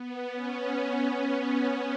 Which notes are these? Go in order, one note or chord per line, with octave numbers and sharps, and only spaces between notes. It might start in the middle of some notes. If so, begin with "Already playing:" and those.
Already playing: B3
C#4
B3